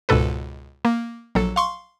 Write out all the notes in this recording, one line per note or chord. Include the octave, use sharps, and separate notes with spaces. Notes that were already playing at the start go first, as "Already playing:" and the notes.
C#2 G#2 B2 A4 B4
A#3
A#1 F#3 A4
F5 C6 C#6